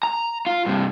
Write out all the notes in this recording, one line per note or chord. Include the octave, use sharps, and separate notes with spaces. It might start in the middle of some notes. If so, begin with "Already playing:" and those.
A#5
F4
G2 C3